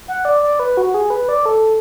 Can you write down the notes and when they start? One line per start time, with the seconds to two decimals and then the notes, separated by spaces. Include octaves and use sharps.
0.08 F#5
0.25 D5
0.43 D5
0.59 B4
0.77 F#4
0.94 G#4
1.10 B4
1.29 D5
1.46 A4